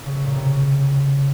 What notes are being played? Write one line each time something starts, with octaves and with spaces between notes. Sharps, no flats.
C#3
A3
A#2
C3
C#3